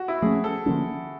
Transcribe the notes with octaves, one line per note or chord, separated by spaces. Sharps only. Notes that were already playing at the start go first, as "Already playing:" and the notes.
Already playing: F#4
E4
F3 A3 C#4 G#4
A4
D3 F3 A#3 C#4